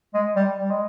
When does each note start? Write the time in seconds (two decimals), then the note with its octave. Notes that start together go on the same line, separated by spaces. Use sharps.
0.14 G#3
0.36 G3
0.59 G3
0.70 G#3